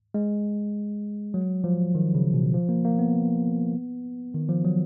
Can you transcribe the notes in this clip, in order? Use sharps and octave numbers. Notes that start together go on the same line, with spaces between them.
G#3
F#3
F3
D#3
C#3
B2
F3
A#3
A#3
B3
D#3
F3
F#3